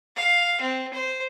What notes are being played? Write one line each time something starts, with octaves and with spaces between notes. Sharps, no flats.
F5
C4
C5